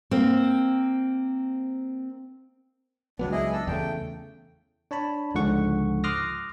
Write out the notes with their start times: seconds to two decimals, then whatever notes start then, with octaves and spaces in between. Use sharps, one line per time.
0.11 A#3 C4
3.19 C#2 F#3 B3 D4
3.32 E4 G#4 D#5
3.53 D4 A4 E6
3.67 E2 C#3 A3 G5
4.91 D4 C#5 A5 B5
5.34 C#2 G#2 D3 F3 F#5 C#6
6.04 C6 D6 D#6 F6 F#6 A#6